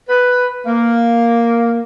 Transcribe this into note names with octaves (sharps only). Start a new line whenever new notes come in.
B4
A#3